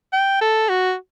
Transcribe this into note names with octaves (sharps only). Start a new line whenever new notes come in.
G5
A4
F#4